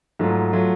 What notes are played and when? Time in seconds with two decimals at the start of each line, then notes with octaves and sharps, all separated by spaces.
0.19 G#2 F#3 A3 F4
0.53 F#3 A3 F4